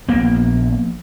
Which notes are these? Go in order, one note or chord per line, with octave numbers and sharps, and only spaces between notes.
A#1 A#3 B3